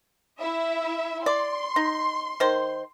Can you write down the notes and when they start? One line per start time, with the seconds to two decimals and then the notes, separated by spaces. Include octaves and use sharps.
0.40 E4 E5
1.26 D5 C6
1.76 D#4
2.40 D#3 C5